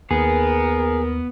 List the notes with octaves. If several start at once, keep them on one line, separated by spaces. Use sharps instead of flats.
D#2 B3 G#4 A#4